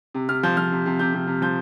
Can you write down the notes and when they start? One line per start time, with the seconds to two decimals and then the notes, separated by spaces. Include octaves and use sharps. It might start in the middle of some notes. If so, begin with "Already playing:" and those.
0.15 C3
0.29 C3 F6
0.43 F3 G6
0.57 F3 F6
0.72 C3
0.86 C3
0.99 C3 G6
1.14 C3
1.27 C3
1.42 F3 G6